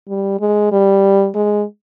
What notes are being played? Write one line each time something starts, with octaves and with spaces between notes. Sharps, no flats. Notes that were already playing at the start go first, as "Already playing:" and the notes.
G3
G#3
G3
G#3